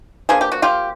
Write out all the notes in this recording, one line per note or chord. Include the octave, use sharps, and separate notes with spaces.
F3 A#3 D4 G#4
G4
F#4
F4 G4